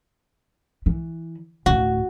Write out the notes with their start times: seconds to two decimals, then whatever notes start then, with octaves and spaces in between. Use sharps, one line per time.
0.86 E3
1.66 D1 A2 F#4